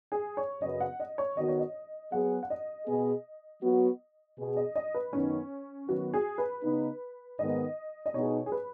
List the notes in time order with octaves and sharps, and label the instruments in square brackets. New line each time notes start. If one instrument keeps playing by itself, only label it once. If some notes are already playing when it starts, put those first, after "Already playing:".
[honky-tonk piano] G#4
C#5
[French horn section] F#2 C#3 F#3 B3 [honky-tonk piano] D#5
[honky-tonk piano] F#5
D#5
C#5
[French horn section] D#3 B3 F#4 [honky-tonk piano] D#5
[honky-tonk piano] C#5
D#5
[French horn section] F#3 B3 G#4 [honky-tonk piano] F#5
[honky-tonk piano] F#5
D#5
[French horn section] B2 B3 G#4
F#3 B3 F#4
B2 B3 G#4
[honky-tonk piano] D#5
D#5
B4
[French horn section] F#2 D#3 B3 D#4 [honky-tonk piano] C#4
[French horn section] D#3 F#3 B3 [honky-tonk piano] F#4
[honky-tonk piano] G#4
B4
[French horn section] C#3 B3 D#4
[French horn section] G#2 D#3 B3 [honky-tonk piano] D#5
[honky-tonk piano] D#5
[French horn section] B2 B3 D#4 G#4 [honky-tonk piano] C#5
[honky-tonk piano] G#4
B4